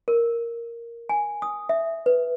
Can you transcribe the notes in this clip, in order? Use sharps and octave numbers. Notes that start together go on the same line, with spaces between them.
A#4
G#5
D#6
E5
B4